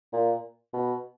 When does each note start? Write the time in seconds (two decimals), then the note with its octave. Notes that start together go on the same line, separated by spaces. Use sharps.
0.13 A#2
0.73 B2